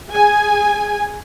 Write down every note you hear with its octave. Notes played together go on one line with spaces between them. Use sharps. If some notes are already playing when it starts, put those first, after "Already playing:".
G#4 G#5